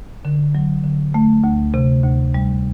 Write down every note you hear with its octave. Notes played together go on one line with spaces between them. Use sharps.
D3
F#3
D3
A3
D2
C3
D2
G3